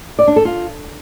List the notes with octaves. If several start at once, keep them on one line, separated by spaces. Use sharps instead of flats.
D5
D4
A4
F4